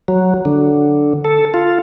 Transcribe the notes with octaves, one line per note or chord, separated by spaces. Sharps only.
F#3
D3
A4
F4